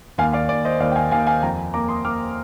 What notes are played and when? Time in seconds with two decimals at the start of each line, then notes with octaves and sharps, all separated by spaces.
0.18 D#2 F5 G#5
0.33 D5 F5
0.49 D#2 D5
0.65 C5 D#5
0.80 D#2 D5 F5
0.92 G5
0.96 F5 G#5
1.11 D#2 F5 G#5
1.27 F5 G#5
1.43 F2 G5 A#5
1.74 A#3 A#5 D6
1.89 C6 D#6
2.04 A#3 D6 F6